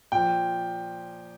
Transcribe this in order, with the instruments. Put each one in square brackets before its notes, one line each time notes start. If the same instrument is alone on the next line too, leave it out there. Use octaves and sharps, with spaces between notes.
[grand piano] A#2 F3 G5